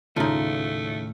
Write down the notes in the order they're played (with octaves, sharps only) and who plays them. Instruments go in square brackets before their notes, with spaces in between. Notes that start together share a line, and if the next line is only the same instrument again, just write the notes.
[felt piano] D#1 C#3 A5 [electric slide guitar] A2 [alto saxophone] A3 [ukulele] D#4 F4